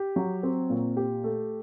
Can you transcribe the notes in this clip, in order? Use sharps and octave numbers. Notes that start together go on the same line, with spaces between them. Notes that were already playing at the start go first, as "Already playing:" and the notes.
Already playing: G4
F#3
C4
A#2
G4
A3